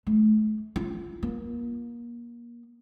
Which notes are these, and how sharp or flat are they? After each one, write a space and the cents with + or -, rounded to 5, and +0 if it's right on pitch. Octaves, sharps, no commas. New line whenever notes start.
A3 -40
F4 -20
A#3 +30